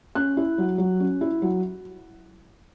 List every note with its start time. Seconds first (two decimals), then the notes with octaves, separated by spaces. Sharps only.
0.15 C#4 F#6
0.37 E4
0.58 F#3
0.78 F#3
1.00 C#4
1.21 E4
1.42 F#3